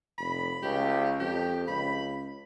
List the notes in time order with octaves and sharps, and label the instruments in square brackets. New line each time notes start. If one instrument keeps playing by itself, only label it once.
[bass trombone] F1 [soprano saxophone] B5
[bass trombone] C#2 [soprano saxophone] G4
[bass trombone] F2 [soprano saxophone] G4
[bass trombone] C#2 [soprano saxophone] B5